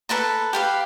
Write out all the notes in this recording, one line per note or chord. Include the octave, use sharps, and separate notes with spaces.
A4 B4 A5 A#5
G4 B4 F5